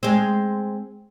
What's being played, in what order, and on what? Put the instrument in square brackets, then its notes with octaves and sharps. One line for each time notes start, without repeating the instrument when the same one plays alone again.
[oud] G#3 C4